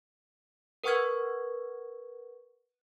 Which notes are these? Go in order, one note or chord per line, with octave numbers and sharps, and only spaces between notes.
A#4 B4 F#5 C#6 F6 G#6